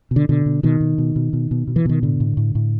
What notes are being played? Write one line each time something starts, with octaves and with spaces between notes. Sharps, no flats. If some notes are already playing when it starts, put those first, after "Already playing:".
B2
D3
B2 D3
B2
B2 D#3
B2
B2
B2
B2
B2
B2
E3
B2 D#3
A2 D3
A2
A2
A2